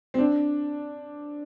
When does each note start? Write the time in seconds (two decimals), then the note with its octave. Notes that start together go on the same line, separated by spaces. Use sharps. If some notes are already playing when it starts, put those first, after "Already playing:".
0.14 C4
0.18 D4